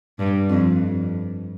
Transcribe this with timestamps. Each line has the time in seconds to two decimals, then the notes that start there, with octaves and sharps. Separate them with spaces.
0.19 G2
0.49 F2